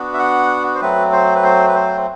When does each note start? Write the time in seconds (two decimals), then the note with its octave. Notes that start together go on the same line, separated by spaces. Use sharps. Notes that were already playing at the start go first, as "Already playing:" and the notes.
Already playing: B3 D4 F#4
0.14 E5
0.19 F#5
0.75 C5
0.81 F#3 A3 C4 B4
1.12 C5
1.35 B4
1.44 C5
1.68 B4
1.75 C5